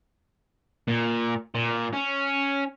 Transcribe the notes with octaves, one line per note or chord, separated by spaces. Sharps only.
A#2
A#2
C#4